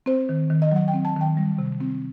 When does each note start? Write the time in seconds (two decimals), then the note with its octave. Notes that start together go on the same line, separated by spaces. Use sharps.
0.06 C4 C5
0.29 D#3
0.50 D#3
0.62 D#5
0.72 F#3 F#5
0.88 G5
0.94 C4
1.05 A5
1.16 D#3 G5
1.37 G3
1.59 C3
1.81 C4